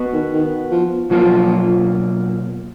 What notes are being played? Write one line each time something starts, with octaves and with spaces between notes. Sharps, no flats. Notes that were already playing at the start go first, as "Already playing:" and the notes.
Already playing: B3 F#4 B4
D#3
D#3
F3
B2 F3 F#3 A#3 F4